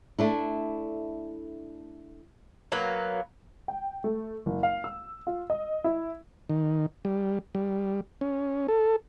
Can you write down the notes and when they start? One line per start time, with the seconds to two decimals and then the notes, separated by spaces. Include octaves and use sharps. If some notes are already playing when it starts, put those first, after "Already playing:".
0.19 A3 D4 E4
2.72 F#3 A#3 B3
3.68 G5
4.04 A3
4.46 F#1
4.63 F5
4.84 E6
5.27 F4
5.50 D#5
5.84 E4
6.49 D#3
7.05 G3
7.55 G3
8.21 C#4
8.68 A4